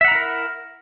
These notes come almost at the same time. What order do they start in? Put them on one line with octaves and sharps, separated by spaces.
E5 F#5 A#5 E4 A#4